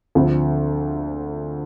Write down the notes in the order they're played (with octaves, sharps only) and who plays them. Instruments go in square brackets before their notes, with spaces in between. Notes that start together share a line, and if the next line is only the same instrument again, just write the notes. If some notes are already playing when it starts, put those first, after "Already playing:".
[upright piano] D2 D3 F3 C4